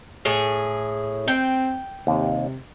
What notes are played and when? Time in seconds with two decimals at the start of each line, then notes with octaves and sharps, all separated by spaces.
0.25 A2 G#4
1.28 C4 G5
2.07 D#2 C3